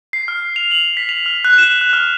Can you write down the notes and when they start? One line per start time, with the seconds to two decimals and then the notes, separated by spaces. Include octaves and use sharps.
0.13 C7
0.28 F6
0.56 F7
0.71 F#7
0.97 B6
1.09 F7
1.26 F6
1.45 F#6
1.58 E7
1.81 F#6
1.93 F6